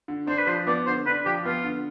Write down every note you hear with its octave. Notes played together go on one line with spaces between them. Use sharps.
D3
D4 C5
B4
F3 C5
B3 D5
D3 C5
D4 B4
F3 G4
B3 F4
D3